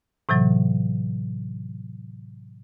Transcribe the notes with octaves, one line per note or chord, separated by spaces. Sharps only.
A2 C3 E3 F#3